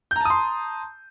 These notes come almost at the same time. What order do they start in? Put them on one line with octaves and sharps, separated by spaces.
G6 A#5 A5 D#6 C6